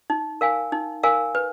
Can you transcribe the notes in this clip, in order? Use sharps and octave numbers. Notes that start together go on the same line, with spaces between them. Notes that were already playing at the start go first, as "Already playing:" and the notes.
D#4
A#4 F5 G#5
D#4
A#4 F5 G#5
B4